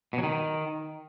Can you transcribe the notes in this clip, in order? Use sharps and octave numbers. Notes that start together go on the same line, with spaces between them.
B2
F#3
D#3